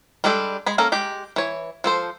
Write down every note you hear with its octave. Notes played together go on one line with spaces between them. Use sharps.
G3 G#3 D4 G4 A4
G#3 G#4 B5
A#3 C#4 A4 A#4
G#3 G4
E3 C#5
F3 A4 C5